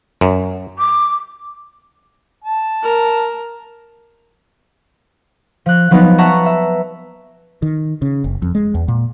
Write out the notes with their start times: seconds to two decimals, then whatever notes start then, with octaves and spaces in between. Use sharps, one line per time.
0.21 F#2
0.79 D6
2.44 A5
2.83 A#4
5.66 F3 F#6
5.91 F3 F#3 B3 D#4
6.18 B4 E5 F#5 A5 A#5 C#6
6.46 E5
7.62 D#3
8.02 C#3
8.24 F#1
8.42 F2
8.55 G#3
8.75 E2
8.88 A#2